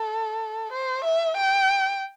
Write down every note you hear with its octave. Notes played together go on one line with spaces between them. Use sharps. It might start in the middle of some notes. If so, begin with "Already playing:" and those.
Already playing: A4
C5
E5
G5